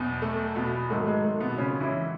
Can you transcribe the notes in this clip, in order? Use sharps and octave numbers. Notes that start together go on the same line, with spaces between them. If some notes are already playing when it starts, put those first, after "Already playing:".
Already playing: E2 B2 F#3 B3
A3
B2 B3
G#2 D#3 F#3 A3
G#3
A3
B2 B3
C#3 C#4
E3 E4